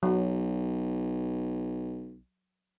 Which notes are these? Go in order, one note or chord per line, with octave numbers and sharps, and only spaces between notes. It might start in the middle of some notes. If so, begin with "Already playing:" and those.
B1 F#3